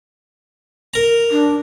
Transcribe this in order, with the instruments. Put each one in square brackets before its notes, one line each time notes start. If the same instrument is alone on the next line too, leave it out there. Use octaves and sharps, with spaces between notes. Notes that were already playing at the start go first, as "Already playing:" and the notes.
[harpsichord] A#4 A#5
[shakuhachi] D4